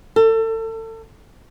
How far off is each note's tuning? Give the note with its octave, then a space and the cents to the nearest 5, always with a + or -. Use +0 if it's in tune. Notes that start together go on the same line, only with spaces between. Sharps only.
A4 +30